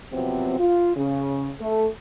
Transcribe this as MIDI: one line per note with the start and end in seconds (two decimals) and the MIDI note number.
0.12 0.58 48
0.12 0.58 53
0.12 0.58 54
0.12 0.58 59
0.12 0.58 60
0.58 0.92 65
0.96 1.50 49
1.60 1.87 57
1.60 1.87 69